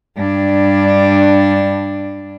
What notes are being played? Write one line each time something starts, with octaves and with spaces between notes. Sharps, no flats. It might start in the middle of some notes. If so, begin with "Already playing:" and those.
G2 D4